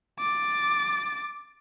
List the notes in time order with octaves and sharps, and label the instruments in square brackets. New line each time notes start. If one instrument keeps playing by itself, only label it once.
[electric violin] D6 A6